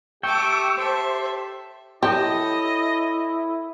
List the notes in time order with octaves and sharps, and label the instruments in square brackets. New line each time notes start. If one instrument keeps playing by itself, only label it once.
[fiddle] A3 D6 [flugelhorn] G4 [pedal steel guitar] G5 [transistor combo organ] C#6 E6
[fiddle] A4 E5 [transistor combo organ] C5
[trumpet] E4 [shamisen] G4 [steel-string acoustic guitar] A4 C#5 [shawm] D#5